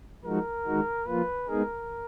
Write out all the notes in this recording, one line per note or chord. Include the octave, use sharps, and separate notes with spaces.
F3 G#3 D#4 F#4 A#4
D#3 G#3 D#4 F#4
F3 A#3 F4 B4
G#3 B3 D#4 G#4 A#4